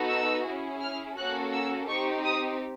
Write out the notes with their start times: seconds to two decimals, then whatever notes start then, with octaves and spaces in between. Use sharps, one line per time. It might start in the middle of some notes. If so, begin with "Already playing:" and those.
Already playing: B3 D#4 F#4 A4
0.10 E6
0.46 C#4 E4 G#4
0.82 F6
1.17 A#3 C#4 F#4 A4 F#6
1.53 E6
1.88 C4 D#4 G4 C#6
2.25 D#6